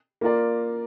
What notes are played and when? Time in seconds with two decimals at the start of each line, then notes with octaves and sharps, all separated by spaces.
0.21 A#3 F4 A#4 D5